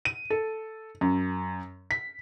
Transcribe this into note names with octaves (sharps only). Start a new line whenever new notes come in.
D#7
A4
F#2
B6